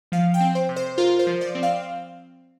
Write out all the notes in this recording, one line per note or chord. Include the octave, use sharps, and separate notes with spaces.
F3 F5
G5
C4
C5
C3
C5
F4 A#4
C5
F3
D5
C4
F5